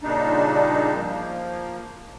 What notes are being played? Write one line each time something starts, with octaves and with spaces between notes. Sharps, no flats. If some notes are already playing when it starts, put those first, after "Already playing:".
A#2 C#3 G3 D4 D#4
F3 A#3